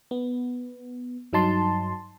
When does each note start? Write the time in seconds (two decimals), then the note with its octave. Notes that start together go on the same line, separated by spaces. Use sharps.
0.11 B3
1.33 G2 F#3 D#4 A5 C6